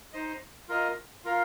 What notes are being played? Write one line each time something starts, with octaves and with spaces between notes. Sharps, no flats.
D#4 C5 D#5
F4 A#4 D#5
F4 A#4 F5